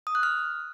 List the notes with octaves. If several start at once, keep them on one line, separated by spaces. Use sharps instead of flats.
D#6
F#6
F6